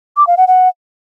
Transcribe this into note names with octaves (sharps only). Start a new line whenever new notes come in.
D6
F5
F#5
F#5